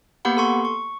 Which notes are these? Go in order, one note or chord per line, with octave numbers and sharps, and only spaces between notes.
A#3 B3 G4 F#5 B5
A4 C6 C#6
C#6